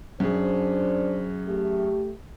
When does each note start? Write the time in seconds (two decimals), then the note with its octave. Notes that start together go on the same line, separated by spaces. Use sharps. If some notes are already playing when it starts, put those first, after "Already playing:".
0.20 F#2 D4 G#4 C5
1.48 A3 G4